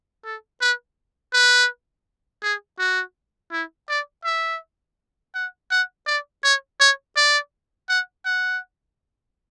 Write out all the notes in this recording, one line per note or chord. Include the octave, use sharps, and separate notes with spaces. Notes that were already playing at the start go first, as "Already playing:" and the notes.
A4
B4
B4
G#4
F#4
E4
D5
E5
F#5
F#5
D5
C#5
C#5
D5
F#5
F#5